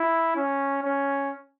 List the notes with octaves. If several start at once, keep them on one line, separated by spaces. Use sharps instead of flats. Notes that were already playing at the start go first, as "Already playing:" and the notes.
Already playing: E4
C#4
C#4